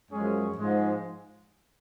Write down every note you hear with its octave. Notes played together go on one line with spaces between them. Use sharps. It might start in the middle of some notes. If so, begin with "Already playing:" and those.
F#2 F3 G#3 C#4 G#4
G#2 F3 G#3